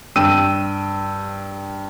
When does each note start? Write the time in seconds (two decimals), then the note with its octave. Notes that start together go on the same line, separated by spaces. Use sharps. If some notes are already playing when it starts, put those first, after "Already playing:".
0.16 G2 G5 E6 D#7